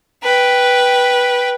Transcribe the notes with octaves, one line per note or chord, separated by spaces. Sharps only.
B4 G5